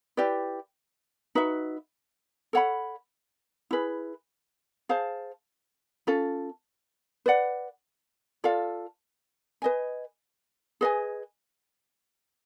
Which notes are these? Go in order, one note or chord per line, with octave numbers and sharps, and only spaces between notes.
E4 G4 B4 D5
D#4 F#4 B4 E5
A4 C#5 F#5 B5
E4 G#4 B4
G#4 C5 F5 A5
C#4 F4 A4
B4 D5 F#5
F4 A4 D5 F5
B4 D#5 G#5
G#4 B4 D#5 G#5